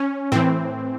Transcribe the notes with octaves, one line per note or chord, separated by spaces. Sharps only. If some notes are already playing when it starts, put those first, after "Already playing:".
Already playing: C#4
A2 E3 C4